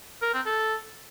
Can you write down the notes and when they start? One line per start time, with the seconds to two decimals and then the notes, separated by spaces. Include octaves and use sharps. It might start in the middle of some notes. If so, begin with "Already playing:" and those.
0.22 A#4
0.34 C4
0.46 A4